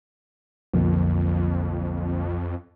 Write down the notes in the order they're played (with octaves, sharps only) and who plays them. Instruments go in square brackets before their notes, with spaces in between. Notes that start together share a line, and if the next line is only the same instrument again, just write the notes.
[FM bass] B1 [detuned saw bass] F2 [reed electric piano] D3 F3 A#3